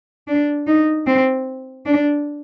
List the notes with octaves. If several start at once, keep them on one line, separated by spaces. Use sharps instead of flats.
D4
D#4
C4
D4